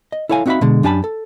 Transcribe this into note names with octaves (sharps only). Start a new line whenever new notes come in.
D#5
E4 A4 C#5 F5 G#5
C4 D#4 F#4 E5 F5 B5
B2 D3 G#3
F#2 D4 G4 G#5 A5 B5
A4